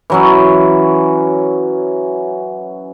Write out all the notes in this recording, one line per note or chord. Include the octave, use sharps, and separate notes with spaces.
E3 F#3 C#4